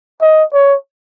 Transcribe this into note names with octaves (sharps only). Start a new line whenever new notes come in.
D#5
C#5